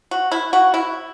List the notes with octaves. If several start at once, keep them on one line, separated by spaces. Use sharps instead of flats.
F#4
E4
F#4
E4